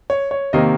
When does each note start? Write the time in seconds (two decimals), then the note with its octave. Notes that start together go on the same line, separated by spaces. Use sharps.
0.10 C#5
0.31 C#5
0.53 C3 D#3 A#3 D#5